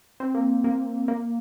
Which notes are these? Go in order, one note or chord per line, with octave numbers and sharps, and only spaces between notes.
C4
A#3
A#3
A#3